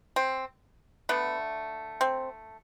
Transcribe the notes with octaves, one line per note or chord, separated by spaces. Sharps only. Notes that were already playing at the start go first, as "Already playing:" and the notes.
C4
D3 A3 B3
C4